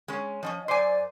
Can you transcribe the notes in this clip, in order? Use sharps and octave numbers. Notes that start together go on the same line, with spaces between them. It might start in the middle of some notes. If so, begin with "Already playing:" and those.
G#3 C#4
F3 C4 C#4 D#5
F#2 C5 D5 G#5 C6 D6